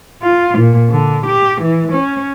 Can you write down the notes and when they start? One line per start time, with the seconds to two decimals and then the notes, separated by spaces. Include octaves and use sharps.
0.22 F4
0.58 A#2
0.90 D3
1.26 G4
1.61 E3
1.92 C#4